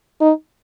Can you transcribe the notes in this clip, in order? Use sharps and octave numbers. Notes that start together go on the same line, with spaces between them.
D#4